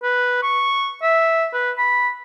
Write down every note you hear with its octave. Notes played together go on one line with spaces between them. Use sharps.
B4
C#6
E5
B4
B5